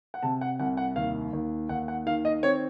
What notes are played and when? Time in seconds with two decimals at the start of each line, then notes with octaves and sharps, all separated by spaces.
0.14 F#5
0.23 C3 A5
0.41 F#5
0.59 C2 F#5
0.77 F#5
0.96 D#2 F5
1.33 D#2
1.69 D#2 F#5
1.88 F#5
2.06 D#3 F5
2.25 D#5
2.43 C4 C#5